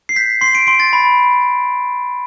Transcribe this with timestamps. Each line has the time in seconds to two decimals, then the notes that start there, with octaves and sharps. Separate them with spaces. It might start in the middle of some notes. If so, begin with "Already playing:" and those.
0.09 C7
0.16 G6 B6
0.41 C6 C7
0.55 D7
0.67 C6 D7
0.80 A6
0.93 B5